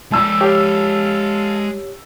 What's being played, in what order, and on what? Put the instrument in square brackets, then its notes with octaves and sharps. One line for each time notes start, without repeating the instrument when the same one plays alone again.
[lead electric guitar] G#3 D5 [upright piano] A5 E6
[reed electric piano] G4 C#5 [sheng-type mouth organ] A4 F5